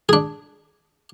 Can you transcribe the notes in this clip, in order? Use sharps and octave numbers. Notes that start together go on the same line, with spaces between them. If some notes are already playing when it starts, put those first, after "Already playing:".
D4 G#4